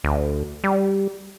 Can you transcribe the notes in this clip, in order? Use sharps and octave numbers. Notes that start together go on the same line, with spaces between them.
D2
G3